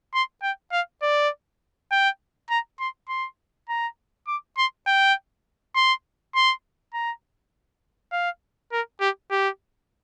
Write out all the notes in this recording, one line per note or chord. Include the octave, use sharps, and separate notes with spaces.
C6
G5
F5
D5
G5
A#5
C6
C6
A#5
D6
C6
G5
C6
C6
A#5
F5
A#4
G4
G4